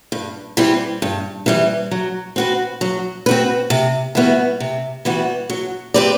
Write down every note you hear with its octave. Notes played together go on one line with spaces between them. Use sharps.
G2
E3 G3 C4 G4
G2
E3 G3 C4 G4
F#3
C4 F#4 B4
F#3
C4 F#4 B4
C3
E3 G3 B3 F#4
C3
E3 G3 B3 F#4
F#3
C4 G4 B4 D5